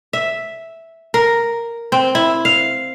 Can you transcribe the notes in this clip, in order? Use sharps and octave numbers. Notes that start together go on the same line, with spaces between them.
E5
A#4
C4
E4
F5